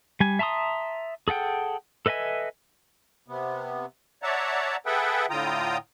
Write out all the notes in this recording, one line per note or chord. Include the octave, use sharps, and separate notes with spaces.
G3 G#5
E5 A5 A#5 C6 D#6
G#4 A4 F#5 G5
A4 B4 D#5 E5 G#5
C3 B3
C#5 D5 E5 F#5 A5 A#5
G#4 A4 B4 E5 F#5 G5
A2 D3 F4 G5 A#5 D#6